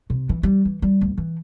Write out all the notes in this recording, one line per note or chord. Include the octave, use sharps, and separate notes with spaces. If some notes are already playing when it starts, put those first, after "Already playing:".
C3
E3
G3
E3
G3
D2
E3